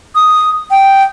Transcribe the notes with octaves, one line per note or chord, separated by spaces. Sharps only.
D#6
G5